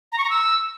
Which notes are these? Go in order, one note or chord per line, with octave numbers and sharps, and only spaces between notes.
A#5
C#6
A#5
E6